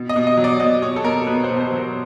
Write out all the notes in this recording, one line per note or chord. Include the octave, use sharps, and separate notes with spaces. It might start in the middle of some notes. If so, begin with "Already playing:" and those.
Already playing: B2
D#5
B2
D#5
F#3
D5
B2 D#5
B2 C#5
A4
B2 A#4
B2 B4
C5
B2
C5
F#3
A#4